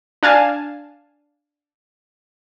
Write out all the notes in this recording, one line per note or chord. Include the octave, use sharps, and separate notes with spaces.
D4 F5 G#5 A5